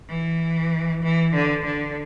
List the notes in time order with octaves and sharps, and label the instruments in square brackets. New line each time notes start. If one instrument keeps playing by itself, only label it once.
[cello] E3
E3
D3
D3